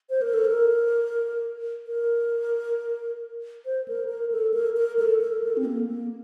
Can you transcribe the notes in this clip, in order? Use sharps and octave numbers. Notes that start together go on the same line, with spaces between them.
C5
A#4
A4
A#4
A#4
C5
A#4
A#4
A4
A#4
A#4
A4
A#4
A4
C4
A#3
A#3